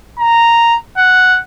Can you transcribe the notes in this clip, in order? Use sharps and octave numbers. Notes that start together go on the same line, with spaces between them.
A#5
F#5